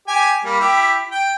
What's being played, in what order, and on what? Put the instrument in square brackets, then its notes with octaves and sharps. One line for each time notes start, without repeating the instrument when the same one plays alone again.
[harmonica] G4 G#5
G3 A#3
E4 G4
G5